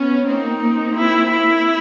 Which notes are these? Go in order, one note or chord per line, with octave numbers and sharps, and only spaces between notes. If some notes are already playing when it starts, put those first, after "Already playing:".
Already playing: B3 C#4
A#3 C4 D#4
A#3 C4
E4
E4